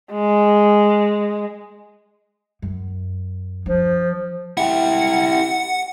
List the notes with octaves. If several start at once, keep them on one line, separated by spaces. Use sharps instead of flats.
G#3
F#2
F3 D4
E4 G4 F#5